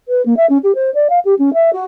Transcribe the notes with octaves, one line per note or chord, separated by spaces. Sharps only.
B4
A#3
E5
C#4
G4
C5
D5
F5
G4
C#4
E5
F#4